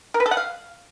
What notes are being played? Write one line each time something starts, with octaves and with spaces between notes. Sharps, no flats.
A#4
B4
A4
F#5
F5